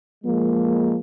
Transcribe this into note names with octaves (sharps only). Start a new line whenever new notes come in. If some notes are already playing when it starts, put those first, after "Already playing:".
F3 G#3 A#3